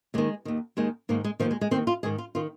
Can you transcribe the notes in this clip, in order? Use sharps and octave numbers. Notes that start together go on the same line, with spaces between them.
D#2 D#3 G#3
D#2 D#3
D#2 D#3 G#3
G#2 D#3 A#3
G#3
D#2 D#3 F3
G#3
G#3
D#2 D#3 C4
F4
G#2 D#3 G#4
F4
D#3 F4